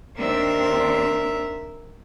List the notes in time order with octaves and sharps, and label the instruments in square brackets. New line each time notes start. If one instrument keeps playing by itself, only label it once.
[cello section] D#2 C4 D4 [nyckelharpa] A#4 E5